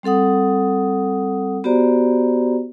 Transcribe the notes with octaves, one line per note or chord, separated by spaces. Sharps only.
G3 C4 A4 F#5 D#6
B3 F#4 G4 C5 D5 A#5